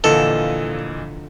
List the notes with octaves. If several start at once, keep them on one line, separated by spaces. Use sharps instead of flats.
A#2 D3 E3 F3 A4 A#4 D#5